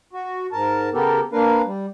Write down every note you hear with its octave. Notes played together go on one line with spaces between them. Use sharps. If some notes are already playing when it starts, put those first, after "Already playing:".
F#4
G#2 A#4 A5
C#3 B3 G4 A4 A#4
A#3 D4 A#4 B4 F5
G3